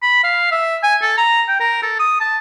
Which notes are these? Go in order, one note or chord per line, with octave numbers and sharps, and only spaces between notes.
B5
F5
E5
G#5
A4
A#5
G5
A#4
A4
D#6
A5